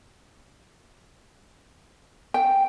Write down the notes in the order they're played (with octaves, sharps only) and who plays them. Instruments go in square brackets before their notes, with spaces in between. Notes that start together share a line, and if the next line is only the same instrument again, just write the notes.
[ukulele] G5